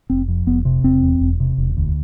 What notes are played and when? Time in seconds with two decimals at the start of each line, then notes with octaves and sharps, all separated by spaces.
0.10 F1 C4
0.28 F2
0.47 F1 B3
0.65 C3
0.84 E1 C4
1.03 E2
1.21 E1
1.40 C3
1.58 E1
1.77 D2